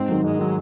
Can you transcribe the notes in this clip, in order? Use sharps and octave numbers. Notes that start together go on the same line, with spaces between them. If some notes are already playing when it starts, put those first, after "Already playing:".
Already playing: G#2 C4
D#3 F#3
G#2 G#3
D#3 F#3